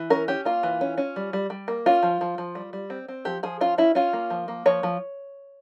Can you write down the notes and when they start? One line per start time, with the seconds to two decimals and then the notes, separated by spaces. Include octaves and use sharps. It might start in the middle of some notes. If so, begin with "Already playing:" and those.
Already playing: E3
0.10 C#4 A#4
0.28 C#4 G4
0.45 A#3 F4
0.63 E3
0.81 C#4
0.98 C#4
1.16 G3
1.33 G3
1.50 G3
1.68 A#3
1.86 C#4 F4
2.03 F3
2.21 F3
2.38 F3
2.55 G3
2.73 G3
2.90 C4
3.08 C4
3.25 F3 G4
3.43 F3 G#4
3.61 C#4 F4
3.78 C#4 E4
3.95 C#4 F4
4.13 A#3
4.30 F3
4.48 A#3
4.66 F3 C#5
4.83 F3